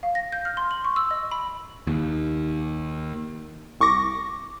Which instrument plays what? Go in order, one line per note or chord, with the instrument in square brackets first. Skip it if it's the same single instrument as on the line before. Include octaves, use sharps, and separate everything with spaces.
[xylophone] F5
A#6
G6
F6
C6
F#7
C#6
E6
D#5
B5
[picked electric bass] D#2
[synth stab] C2 C#6 D6 A#6